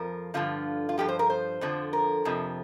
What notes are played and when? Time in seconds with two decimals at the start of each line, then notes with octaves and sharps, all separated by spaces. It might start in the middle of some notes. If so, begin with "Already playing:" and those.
Already playing: F2 F3 A#4
0.34 G2 D3 F3 F4
0.89 F4
0.98 G2 F3 G4
1.09 C5
1.19 A#4
1.30 C5
1.61 F2 D3 F3
1.93 A#4
2.25 F2 C3 F3